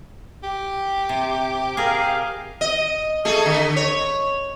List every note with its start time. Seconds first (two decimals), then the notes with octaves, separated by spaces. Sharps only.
0.43 G4
1.09 C3
1.77 G#4 A#4 F5
2.61 D#5
3.25 A3 G#4 A4
3.46 D3
3.76 C#5